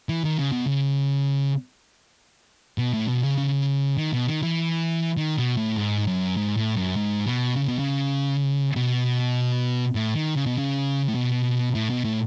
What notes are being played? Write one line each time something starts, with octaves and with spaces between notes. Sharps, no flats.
E3
D#3
C#3
B2
C#3
B2
A2
B2
C#3
C#3
D#3
B2
D#3
E3
D#3
B2
A2
G#2
F#2
G#2
A2
F#2
G#2
B2
C#3
B2
C#3
B2
A2
D#3
C#3
B2
C#3
A2
B2
A2
B2
A2